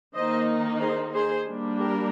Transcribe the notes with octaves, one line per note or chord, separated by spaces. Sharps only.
D#3 A#3 D#4 C5 D#5
G#4 C5
G#4 C5
G3 A#3 D4
G4 A#4